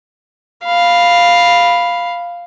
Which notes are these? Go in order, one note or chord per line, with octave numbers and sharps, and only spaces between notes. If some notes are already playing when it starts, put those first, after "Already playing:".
F5 B5